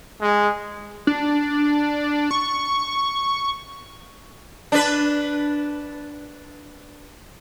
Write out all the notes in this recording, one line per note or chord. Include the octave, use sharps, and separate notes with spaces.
G#3
D4
C#6
D4 B4